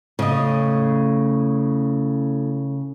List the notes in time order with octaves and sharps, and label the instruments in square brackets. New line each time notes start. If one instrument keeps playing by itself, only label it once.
[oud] A2 D#5 [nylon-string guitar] C#3